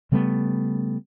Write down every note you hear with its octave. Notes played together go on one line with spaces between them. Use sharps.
C#3 G3 A3 B3